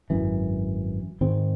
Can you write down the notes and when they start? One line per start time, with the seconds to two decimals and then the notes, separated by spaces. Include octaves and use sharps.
0.10 G#1 F#2 E3
1.21 G#2 D#3 G#3 C4